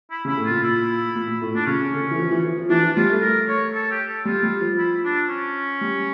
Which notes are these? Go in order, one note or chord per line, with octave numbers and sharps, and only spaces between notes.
E4
C#3 E4
A2
F4
A#2
E4
A#2
A#2
A2
A#2 D4
C#3 C#4
D3
D3
E3
F3
E3
F3
F3
E3 D4
F3
G3 F4
A3
A#4
C#5
A4
G4
A4
G3 F4
G3
F3
E4
D4
C#4
G3